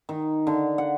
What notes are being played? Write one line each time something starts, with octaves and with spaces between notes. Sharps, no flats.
D#3
D3
F#5